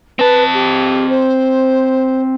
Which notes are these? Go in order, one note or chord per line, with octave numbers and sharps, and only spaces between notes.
C4 B4 A5
G4
C5